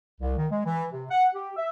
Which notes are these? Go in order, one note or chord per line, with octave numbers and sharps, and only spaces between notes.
C2
D#3
G#3
E3
C3
F#5
G4
E5